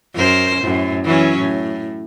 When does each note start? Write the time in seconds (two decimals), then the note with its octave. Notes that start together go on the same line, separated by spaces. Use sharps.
0.14 F#2 A#4 C5
0.61 F#2 A2
1.04 E3 F#3 C#4
1.38 A2